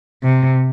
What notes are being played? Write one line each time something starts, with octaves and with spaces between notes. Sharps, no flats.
C3